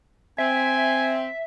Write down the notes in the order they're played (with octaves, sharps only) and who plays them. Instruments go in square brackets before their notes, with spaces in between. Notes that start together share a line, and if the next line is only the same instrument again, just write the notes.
[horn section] C4 [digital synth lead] E5 [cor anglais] G#5